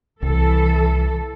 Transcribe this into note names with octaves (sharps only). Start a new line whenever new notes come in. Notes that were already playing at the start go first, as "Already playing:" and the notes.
C2 E3 A4